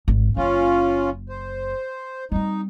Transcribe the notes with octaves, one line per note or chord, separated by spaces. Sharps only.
G#1
F#1 C#4 F4
C5
G3 C4 D#4